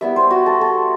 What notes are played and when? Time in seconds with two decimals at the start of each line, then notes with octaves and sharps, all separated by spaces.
0.01 G3 B3 E4 E5
0.16 C5
0.31 F#4
0.46 A4
0.61 A4